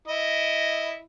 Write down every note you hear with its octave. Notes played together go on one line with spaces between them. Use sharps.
E4 D#5